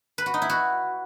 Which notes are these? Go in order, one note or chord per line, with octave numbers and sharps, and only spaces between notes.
B4
F#4
D#4
E4
F#4